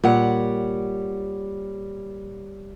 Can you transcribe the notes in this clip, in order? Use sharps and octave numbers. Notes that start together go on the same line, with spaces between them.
A#2 G3 C#5 F#5